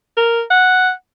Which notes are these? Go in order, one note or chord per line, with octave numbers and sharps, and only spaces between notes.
A#4
F#5